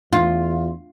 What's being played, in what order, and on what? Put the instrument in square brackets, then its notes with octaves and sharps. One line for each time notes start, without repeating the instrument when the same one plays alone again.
[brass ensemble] E2 [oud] F4